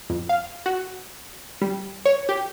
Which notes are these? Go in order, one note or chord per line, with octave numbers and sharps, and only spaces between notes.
F2
F5
F#4
G3
C#5
G4